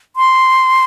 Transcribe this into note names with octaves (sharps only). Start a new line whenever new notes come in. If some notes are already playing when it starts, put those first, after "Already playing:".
C6